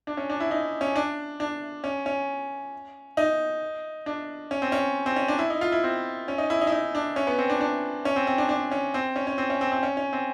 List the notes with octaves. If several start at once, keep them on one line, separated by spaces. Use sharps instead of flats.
D4
C#4
D4
E4
D#4
C#4
D4
D4
C#4
C#4
D#4
D4
C#4
C4
C#4
C4
C#4
D4
E4
D#4
F4
E4
C4
C#4
D#4
E4
D#4
E4
D#4
D4
C#4
B3
C4
D4
D4
C#4
C4
C4
D4
D4
C#4
C4
C#4
C#4
C4
C#4
C4
C4
C#4
C#4
C4